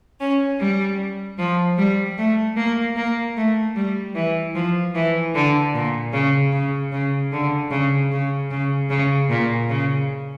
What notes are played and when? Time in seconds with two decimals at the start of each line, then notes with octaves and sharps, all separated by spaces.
0.20 C#4
0.59 G3
1.38 F3
1.77 G3
2.17 A3
2.56 A#3
2.96 A#3
3.36 A3
3.75 G3
4.14 E3
4.54 F3
4.94 E3
5.34 D3
5.73 A#2
6.12 C#3
6.51 C#3
6.91 C#3
7.31 D3
7.70 C#3
8.10 C#3
8.50 C#3
8.89 C#3
9.29 A#2
9.68 C#3